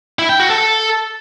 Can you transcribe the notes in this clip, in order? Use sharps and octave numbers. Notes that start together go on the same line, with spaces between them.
E4
G5
F#4
A4